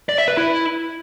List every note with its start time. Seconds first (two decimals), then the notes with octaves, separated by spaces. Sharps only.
0.09 D5
0.18 E5
0.28 B4
0.37 E4